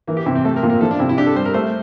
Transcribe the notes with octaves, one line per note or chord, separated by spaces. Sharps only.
E3 A#3
G4
C3 E4
C4
A3 A4
A#4
A#2
A#4
F3 A4
D4
C3 E4
E4
D4 G4
A4
G3 C5
A#4
A3 C5